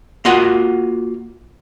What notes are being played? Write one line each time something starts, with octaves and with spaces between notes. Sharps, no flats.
A#3 F4 F#4 D#5 F#5